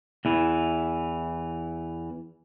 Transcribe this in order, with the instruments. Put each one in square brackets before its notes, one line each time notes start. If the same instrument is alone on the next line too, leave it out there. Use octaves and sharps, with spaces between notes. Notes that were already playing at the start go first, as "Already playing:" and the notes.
[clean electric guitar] E2 E3